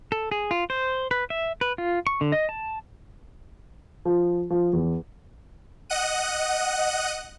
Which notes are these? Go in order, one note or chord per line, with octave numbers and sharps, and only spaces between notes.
A4
G#4
F4
C5
B4
E5
B4
F4
C#6
D3
D#5
A5
F3
F3
E2
D#5 F#5 F#6 D#7